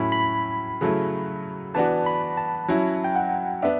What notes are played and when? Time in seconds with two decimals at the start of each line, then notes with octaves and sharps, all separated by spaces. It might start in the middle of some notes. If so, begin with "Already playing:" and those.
Already playing: A2 F#3 C#4 E4 B5
0.12 B5
0.81 C#3 F#3 A3 E4
1.74 E3 B3 D4 F#4 A5
2.06 B5
2.37 A5
2.68 F#3 C#4 E4
3.04 G5
3.16 F#5
3.62 B3 D4 E5